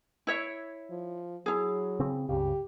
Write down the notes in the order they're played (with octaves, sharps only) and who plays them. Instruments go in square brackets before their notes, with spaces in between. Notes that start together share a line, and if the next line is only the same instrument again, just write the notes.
[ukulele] E4 C#5 E5
[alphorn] F3
[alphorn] F#3 [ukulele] E4 G#4
[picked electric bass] C#3 C4
[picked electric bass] C#2 G2 C#3 [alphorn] G4